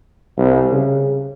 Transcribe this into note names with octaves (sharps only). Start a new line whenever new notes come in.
C2
C#3